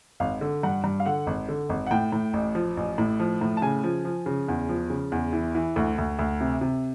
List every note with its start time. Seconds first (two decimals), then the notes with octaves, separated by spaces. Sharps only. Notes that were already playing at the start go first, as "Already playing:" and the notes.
0.20 G#1 F5
0.41 D3
0.63 G2 F#5
0.84 G2
1.00 F5
1.06 D3 F#5
1.27 G#1
1.48 D3
1.69 G#1
1.87 F#5
1.91 A2 G5
2.12 A2
2.33 A1
2.55 F3
2.77 A1
2.98 A2
3.20 F3
3.41 A2
3.57 A5
3.62 C#3 G#5
3.84 F3
4.05 F3
4.26 C#3
4.48 E2
4.69 F3
4.90 C#3
5.12 E2
5.33 E3
5.55 E3
5.76 D2
5.98 D2
6.19 D2
6.41 C3
6.61 C3